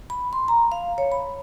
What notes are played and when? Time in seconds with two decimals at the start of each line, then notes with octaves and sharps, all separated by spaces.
0.10 B5
0.33 C6
0.48 A#5
0.72 F5
0.98 C#5
1.12 B5